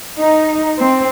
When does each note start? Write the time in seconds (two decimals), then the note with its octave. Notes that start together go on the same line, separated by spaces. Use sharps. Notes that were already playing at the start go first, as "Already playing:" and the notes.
0.18 D#4
0.80 C4